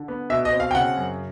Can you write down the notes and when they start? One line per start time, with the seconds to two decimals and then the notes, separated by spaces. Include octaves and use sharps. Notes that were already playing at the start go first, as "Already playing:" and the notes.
Already playing: D3
0.08 B3
0.30 B2 E5
0.45 D#5
0.53 C4
0.60 F5
0.71 G5
0.75 C#3 F#5
0.97 F#2